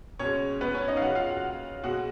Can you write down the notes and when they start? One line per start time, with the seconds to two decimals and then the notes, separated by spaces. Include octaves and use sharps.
0.19 B2 C#4 C#5
0.25 G#3
0.61 B3 B4
0.75 C#4 C#5
0.88 D#4 D#5
0.97 F5
1.02 C#3 F#3 F#4 F#5
1.15 F4 F5
1.29 F#4 F#5
1.84 B2 G#3 F#4 F#5